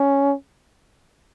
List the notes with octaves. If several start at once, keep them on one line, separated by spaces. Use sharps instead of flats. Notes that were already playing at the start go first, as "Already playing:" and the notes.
Already playing: C#4